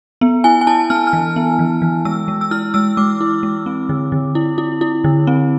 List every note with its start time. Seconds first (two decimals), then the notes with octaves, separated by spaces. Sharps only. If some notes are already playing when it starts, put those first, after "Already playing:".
0.21 B3
0.44 E4 G#5
0.61 G#5
0.67 E4 A5
0.90 B3 F6
1.07 F6
1.13 E3
1.36 B3
1.59 E3
1.82 E3
2.05 G#3 E6
2.28 G#3
2.41 E6
2.51 E4 F6
2.74 G#3 E6
2.97 G#3 D6
3.21 E4
3.43 G#3
3.66 C4
3.89 D3
4.12 D3
4.35 E4
4.58 E4
4.81 E4
5.04 D3
5.27 C4